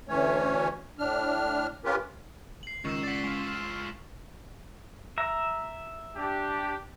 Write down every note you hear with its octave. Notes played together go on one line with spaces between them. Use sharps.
D2 E3 A3 C#4 C#5
A2 D4 F6
C#4 F4 G4 A#4 B4
C7 F#7
C#2 D#3 C#6 E6 E7
D5 F#5 A6 B6
G#3 F4
F6 E7
E5 A#5
D4 G4